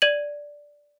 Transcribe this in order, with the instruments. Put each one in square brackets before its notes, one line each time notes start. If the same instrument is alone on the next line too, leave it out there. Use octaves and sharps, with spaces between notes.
[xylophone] D5 G#6 D#7 F#7